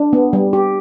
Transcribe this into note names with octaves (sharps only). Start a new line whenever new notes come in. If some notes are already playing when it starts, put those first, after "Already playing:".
Already playing: D4
B3
G3
G4